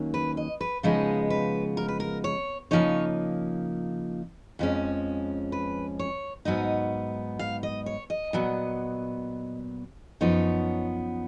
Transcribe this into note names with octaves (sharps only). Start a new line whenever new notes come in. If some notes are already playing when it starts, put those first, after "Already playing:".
Already playing: D#2 D#3 F#3 A#3 C#4
B4
D#5
B4
C#3 F3 G#3 B3 D#4 D#5
B4
A#4
B4
A#4
C#5
C#3 F3 A#3 D#4 C#5
F2 F3 G#3 C#4
B4
C#5
G#2 F#3 B3 D#4 D#5
F5
D#5
C#5
D#5
A#2 F#3 B3
F#2 F3 B3 D#4 C#5